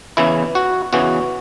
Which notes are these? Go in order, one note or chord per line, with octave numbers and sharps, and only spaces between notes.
E2 C#3 E3 E4
F#4
E2 C#3 E3 F#4